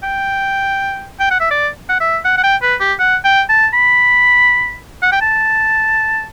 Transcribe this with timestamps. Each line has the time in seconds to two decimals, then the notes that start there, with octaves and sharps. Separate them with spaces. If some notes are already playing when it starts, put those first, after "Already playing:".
0.03 G5
1.20 G5
1.31 F#5
1.40 E5
1.51 D5
1.89 F#5
2.00 E5
2.25 F#5
2.38 F#5
2.43 G5
2.62 B4
2.80 G4
2.99 F#5
3.24 G5
3.49 A5
3.73 B5
5.02 F#5
5.12 G5
5.21 A5